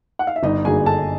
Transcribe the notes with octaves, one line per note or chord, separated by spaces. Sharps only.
F#5
F5
E5
G1 D#4 D#5
F#2 D3 F#3 A#3 G#4 G#5
G1 A4 A5